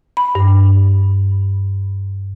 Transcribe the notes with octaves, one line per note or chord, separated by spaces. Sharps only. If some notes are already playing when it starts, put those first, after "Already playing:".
B5
G2